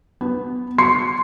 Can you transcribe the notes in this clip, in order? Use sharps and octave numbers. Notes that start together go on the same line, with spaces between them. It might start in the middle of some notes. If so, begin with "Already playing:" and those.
B3
C6 C7 C#7